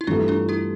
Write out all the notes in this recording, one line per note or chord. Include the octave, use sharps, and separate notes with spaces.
E4
G2 E3 A3 D4 F4
D4 F4
E4 G4